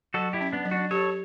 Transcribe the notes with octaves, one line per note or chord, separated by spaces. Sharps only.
F#3 F#4 A4
E4 G4
C#4
B3 D4
F#3
D4 F#4
G4 A4 C#5